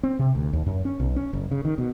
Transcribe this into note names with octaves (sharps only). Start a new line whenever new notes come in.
C4
C3
D2
D#2
F#2
C#4
B1
C#4
F#1
C#3
D#3
B2